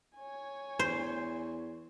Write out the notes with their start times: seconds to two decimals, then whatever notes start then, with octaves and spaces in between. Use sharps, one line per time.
0.16 C#5 G#5
0.79 E2 C5